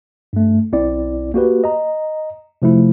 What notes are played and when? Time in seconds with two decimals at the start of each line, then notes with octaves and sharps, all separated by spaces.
0.33 G2 A3
0.72 B1 C4 E4 D5
1.34 A#3 F#4 G4 B4
1.64 D#5 A#5
2.62 C3 F3 A3 E4